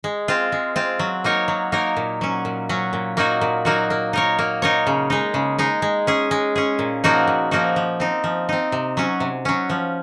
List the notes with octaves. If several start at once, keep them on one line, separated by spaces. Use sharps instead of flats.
G#3
C4 F4
G#3
C4 F4
F#3
A#3 D#4 A#4 C#5
F#3
A#3 D#4 A#4 C#5
A#2
F#3 C#4
A#2
F#3 C#4
A#2
F#3 A#3 D#4 F#4
A#2
F#3 A#3 D#4 F#4
A#3
D#4 A#4 C#5
A#3
D#4 A#4 C#5
C#3
G#3 D#4
C#3
G#3 D#4
G#3
C#4 G#4
G#3
C#4 G#4
A#2
F3 A#3 D#4 F#4
A#2
F3 A#3 D#4 F#4
F3
C4 D#4
F3
C4 D#4
C3
F#3 C#4
C3
F#3 C#4
F3